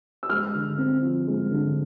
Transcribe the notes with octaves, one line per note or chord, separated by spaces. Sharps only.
E6
G#3 F6
D3
C4
F3
G#3
D3